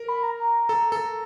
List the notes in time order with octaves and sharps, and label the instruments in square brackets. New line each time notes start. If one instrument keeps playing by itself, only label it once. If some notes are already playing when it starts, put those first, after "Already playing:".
Already playing: [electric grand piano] A#4
[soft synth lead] B5
A#5
[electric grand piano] A4
A4